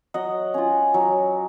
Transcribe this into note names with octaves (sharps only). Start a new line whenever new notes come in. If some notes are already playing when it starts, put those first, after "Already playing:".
F#3 D#5 F#5
C#4 F4
F#3